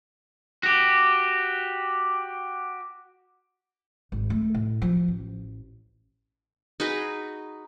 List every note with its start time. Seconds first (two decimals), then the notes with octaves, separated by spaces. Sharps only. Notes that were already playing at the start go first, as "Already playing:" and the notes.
0.63 F#4 G4
4.12 G#1
4.30 A3
4.55 A2
4.82 F3
5.08 A1
6.80 D#4 F#4 G#4 B4